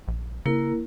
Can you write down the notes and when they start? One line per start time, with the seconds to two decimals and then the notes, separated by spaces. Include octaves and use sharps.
0.08 A#1
0.46 C#3 A#3 E4 A#4